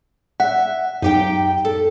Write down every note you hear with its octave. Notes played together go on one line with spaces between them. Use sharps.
E5 F#5
F#2 D#4 G4 G5
A4